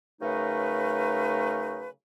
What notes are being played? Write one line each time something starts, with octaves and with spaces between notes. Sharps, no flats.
C#3 F#3 A3 D#4 A#4 B4